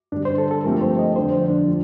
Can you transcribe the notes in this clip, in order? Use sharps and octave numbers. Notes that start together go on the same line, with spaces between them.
G2 D3 G3 D4
C5
A4
A4
G2 F3 A3 C4 G4 A#4
C5
D#5
F2 D3 G3 C5
C5
D4
F3